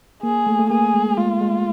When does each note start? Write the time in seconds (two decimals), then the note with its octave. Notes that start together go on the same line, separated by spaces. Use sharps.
0.23 A#3 G#4
0.47 A3
0.59 A3
0.70 A#3 G#4
0.94 G#3
1.17 G#3 F4
1.41 G#3